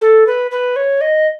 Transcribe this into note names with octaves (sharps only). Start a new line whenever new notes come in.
A4
B4
B4
C#5
D#5